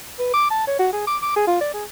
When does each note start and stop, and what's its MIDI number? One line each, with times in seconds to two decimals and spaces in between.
0.19 0.30 71
0.34 0.46 86
0.51 0.64 81
0.67 0.76 73
0.79 0.88 66
0.93 1.06 68
1.07 1.17 86
1.22 1.34 86
1.36 1.45 68
1.47 1.57 65
1.61 1.70 74
1.74 1.84 68